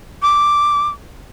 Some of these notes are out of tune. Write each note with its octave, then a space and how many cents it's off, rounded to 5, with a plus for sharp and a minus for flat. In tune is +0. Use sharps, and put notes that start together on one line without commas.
D6 +0